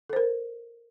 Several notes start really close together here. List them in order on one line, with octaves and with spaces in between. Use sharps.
A4 C5 A#4